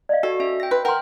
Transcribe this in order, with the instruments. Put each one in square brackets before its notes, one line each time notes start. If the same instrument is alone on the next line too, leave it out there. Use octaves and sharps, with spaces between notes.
[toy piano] D5 D#5 F5
[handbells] F#4 [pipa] A4
[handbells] C#4 E5
G5 A#6
[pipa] B4 [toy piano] C6
[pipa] A#4 [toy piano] F#5 C6 [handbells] G5 F6